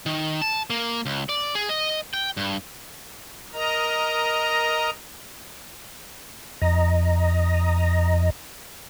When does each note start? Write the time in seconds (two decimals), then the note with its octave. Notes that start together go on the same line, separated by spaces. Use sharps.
0.06 D#3
0.42 A5
0.70 A#3
1.06 C#2
1.29 D5
1.55 G#4
1.69 D#5
2.14 G5
2.37 G2
3.53 A#4 D#5 A#5
6.62 F2 D#5 A#5